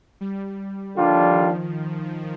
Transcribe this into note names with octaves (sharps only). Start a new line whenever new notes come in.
G3
D#2 D3 F3 G3 D4 F4
D#3